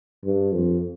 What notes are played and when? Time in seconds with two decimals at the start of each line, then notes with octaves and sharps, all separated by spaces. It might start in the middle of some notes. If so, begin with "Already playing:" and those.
0.24 G2
0.52 F2